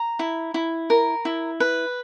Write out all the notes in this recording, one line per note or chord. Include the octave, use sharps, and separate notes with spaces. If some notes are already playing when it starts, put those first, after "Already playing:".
Already playing: A#5
E4
E4
A#4
E4
B4